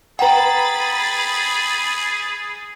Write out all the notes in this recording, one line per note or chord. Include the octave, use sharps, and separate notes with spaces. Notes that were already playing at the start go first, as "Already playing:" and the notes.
G#4 B4 F#5 G5 A#5 B5 A6